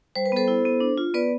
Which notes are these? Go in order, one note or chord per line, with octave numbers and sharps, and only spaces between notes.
G3 C5
B4
B3 A4 C5
E4
B3
D4
F4
B3 B4 D5